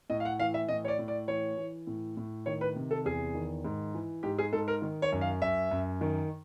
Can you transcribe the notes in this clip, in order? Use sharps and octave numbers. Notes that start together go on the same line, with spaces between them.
A2 D#5
F5
F#5
E3 F5
E5
A2 D#5
C#5
D5
A2
D5
E3 C#5
E3
A2
A2
D#3 C#5
B4
C3
A4
E2 G#4
D#3
G#2
E3
G#2 G4
G#4
G#2 A4
A#4
D#3
C#5
F#2
F5
F#2 E5
F#2
D#3